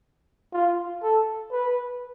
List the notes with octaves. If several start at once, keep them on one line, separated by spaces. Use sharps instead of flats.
F4
A4
B4